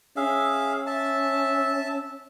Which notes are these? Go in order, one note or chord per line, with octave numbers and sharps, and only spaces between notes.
C#4 G#4 E5 F5
E5 A5